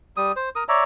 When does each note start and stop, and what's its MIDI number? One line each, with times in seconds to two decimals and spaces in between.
0.17 0.32 55
0.17 0.32 87
0.36 0.49 72
0.56 0.64 70
0.56 0.64 87
0.69 0.84 73
0.69 0.84 74
0.69 0.84 76
0.69 0.84 82